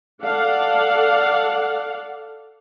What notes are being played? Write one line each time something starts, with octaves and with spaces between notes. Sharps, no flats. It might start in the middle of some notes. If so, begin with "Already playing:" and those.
A4 D5 F5 F#5